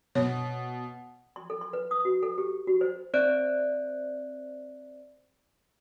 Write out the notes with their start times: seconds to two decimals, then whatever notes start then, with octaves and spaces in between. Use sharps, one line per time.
0.15 B2 C#5
1.36 C6
1.50 A4
1.61 C6
1.73 B4
1.91 D#6
2.05 F#4
2.23 A4
2.38 G4
2.67 F#4
2.81 C5
3.14 C4 C5 D5 E5 F#6 D7